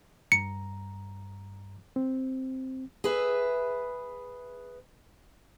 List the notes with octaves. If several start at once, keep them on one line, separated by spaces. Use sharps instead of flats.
G2 A#5 C#7
C4
G#4 B4 E5